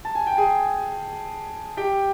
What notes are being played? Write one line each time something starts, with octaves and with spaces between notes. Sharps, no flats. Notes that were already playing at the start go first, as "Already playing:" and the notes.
A5
G#5
G5
G#4 G#5
G4 G5